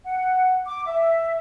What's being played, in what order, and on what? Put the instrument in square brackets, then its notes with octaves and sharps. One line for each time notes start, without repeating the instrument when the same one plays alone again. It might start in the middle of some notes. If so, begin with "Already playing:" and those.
[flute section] F#5
D6
E5